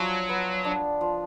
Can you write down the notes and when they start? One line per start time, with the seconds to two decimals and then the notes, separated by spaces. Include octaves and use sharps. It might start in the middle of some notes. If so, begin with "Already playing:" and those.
Already playing: F3 F#3 D4
0.29 B3
0.65 D4
1.01 F3